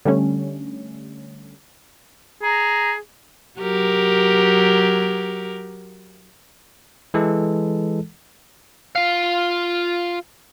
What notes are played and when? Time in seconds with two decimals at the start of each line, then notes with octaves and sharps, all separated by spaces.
0.05 D3 G3 A3 C#4
2.42 G#4 A#5
3.60 F#3 G4 A#4
7.14 E3 G#3 A4
8.96 F4 F5